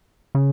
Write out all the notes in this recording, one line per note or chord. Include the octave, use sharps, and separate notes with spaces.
C#3